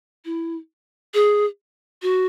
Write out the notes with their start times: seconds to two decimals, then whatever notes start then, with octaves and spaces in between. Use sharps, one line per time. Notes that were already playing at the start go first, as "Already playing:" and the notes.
0.25 E4
1.14 G#4
2.02 F#4